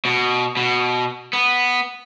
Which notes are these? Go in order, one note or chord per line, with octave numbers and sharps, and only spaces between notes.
B2
B2
B3